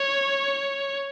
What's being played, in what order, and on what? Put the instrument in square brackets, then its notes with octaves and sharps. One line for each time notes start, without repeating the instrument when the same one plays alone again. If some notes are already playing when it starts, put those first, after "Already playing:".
Already playing: [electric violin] C#5